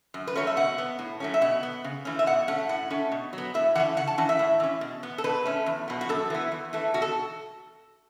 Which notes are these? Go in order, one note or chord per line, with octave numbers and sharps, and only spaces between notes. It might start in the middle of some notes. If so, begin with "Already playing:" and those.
F#2
B4
F#3 A3 C#4 C#5
E5
B2 F#5
B3
A2
F#3 A3 C#4
E5
B2 F#5
B3
C#3
E3 A3 C#4
E5
B2 F#5
A3 C#4 F#5
A2 F#5
A3 C#4
B2
F#3
B3
A2 E5
E3 A3 C#4 F#5
C#3 F#5
A5
E3 C#4 F#5
E5
A2
E3 C#4
B2
B3
A4
B2 B4
A3 C#4
E2
B2 F#3 B3
F#4
F#2 A4
E3 B3
E2
E3 A3
B2 F#4
A4